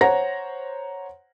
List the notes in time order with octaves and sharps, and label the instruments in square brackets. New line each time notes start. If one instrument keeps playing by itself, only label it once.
[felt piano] C5 C#5 F#5 A#5 A#6